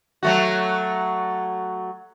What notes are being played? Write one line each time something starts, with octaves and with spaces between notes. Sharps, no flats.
F#3 A3 F#4